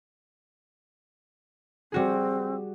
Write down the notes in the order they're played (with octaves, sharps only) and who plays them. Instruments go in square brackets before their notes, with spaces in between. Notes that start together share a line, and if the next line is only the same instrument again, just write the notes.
[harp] G3 F#4 G#4 [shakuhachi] C4